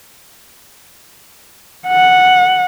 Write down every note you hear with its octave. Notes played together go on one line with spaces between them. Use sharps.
F#5